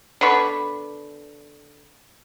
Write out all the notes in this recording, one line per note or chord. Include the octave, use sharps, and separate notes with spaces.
D3 B3 B5 C#6